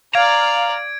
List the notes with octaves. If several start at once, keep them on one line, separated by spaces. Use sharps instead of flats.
D5 F5 A#5 G#6 D7